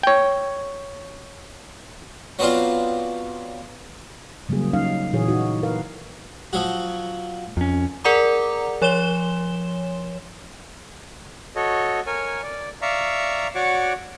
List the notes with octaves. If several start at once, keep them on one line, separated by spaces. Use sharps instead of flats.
C#5 G5
F#3 B3 C4 D4 F4
C#3 F#3 G3 A#3 G#4
F#3 C#4 D#4 F5
A#2 E3 F#4 G#4 C#5
D#4 E4 F#4
A#4 B4 F5
F3 F#3 F#4
F2 C#4
G#4 A#4 D5 F#5 A#5 D6
F3 C#5 C6 E7 G7
F#4 A4 C#5 D#5
A#4 C#5 G#5
D5
D5 E5 F5 A#5 C#6
F#4 C#5 D5 F#5 C#6 D6